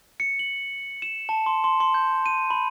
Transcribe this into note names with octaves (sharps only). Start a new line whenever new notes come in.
C#7
F#7
E7
A5
C6
C6
C6
G6
D#7
B5